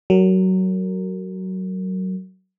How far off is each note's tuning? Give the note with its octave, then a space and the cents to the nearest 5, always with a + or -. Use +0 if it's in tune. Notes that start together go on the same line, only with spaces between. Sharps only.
F#3 +20 A#4 -20